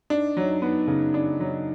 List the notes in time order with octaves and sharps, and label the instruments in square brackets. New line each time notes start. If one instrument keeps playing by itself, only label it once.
[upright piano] D4 [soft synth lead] D#4
[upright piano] F#3 [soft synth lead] D#4
[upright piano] B3 [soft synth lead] D#4
[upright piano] C#3
D4
F#3